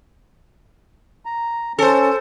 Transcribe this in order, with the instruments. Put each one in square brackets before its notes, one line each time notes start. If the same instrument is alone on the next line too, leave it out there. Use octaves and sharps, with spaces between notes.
[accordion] A#5
[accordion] C#4 [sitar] A4 C5